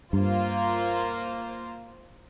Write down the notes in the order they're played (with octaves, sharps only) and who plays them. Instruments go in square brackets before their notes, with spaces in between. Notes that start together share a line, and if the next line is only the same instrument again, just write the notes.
[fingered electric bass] G2 [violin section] A#3 F4 C5